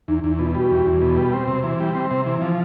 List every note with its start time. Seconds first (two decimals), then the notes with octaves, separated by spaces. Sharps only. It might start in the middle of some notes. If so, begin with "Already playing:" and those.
0.08 E2 D#4
0.24 E2 D#4
0.39 B2 F4
0.55 G3 F#4
0.71 E2
0.86 E2
1.02 B2
1.17 G3
1.33 C4
1.48 C3
1.64 E3
1.80 G3
1.95 C4
2.11 C3
2.26 E3
2.42 F3